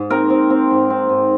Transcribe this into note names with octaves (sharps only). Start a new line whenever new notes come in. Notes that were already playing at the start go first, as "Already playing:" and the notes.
Already playing: G#2
C4 A#4
C4
C4
G#2
C4
G#2